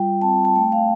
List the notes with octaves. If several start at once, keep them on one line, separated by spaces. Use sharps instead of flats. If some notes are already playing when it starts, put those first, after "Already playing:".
Already playing: G3 F4 G5
C4 A5
A5
A3 G5
F5